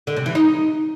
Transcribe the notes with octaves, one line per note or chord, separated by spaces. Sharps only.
D3
C3
E3
D#4